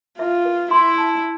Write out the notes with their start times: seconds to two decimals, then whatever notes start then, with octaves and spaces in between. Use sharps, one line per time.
0.19 F4 E5
0.45 B4
0.71 E4 C6
0.98 A5